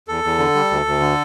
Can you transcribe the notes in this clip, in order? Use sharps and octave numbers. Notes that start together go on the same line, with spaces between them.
E2 A4
E2
D3
G3
D2
D2
D3